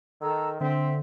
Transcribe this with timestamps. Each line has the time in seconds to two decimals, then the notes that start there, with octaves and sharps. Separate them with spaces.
0.21 D#3 A4 A#5 E6
0.60 D3 C4 E5